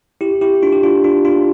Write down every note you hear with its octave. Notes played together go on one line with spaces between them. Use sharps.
E4 G4
E4 G4
D4 F4
G4
D4 F4
D4 F4
D4 F4